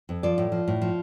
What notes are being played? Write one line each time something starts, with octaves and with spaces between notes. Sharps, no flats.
F2
F3 D5
A2
F3
A2
F3